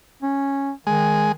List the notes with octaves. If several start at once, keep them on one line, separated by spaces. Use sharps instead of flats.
C#4
D#3 G#3